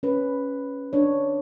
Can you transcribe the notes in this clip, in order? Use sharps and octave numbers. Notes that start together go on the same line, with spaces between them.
C#4 B4
D4 C#5